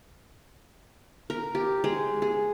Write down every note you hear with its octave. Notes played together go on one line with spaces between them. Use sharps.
A#4
G4
G#3
G#4